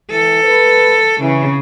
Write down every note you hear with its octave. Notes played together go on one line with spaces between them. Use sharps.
E3 A4
B4
C#3 E3